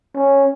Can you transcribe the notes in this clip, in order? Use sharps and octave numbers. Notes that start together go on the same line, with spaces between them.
C#4